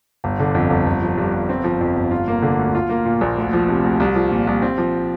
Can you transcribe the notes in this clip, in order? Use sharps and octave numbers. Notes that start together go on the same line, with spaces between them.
G1
D3
F2
G1
G1
F3
G2
G1
C4
F3
F2
G1
F4
A#3
D3
D2
F4
A#3
A#2
A#1
D2
F3
C3
D2
C2
F3
A#2
C2
C4
F3